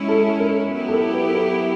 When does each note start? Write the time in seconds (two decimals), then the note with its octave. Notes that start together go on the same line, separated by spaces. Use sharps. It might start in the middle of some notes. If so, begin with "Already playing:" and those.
Already playing: G#3 C#4 E4
0.08 A4
0.40 A#4
0.72 F#3 B3 E4 G4
0.88 A4
0.93 A#4
1.14 B4
1.31 A#4
1.35 A4